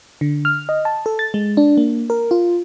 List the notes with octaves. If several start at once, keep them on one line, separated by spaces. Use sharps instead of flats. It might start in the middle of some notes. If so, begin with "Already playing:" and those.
D3
F6
D#5
A5
A4
A6
G#3
D4
A#3
A#4
F4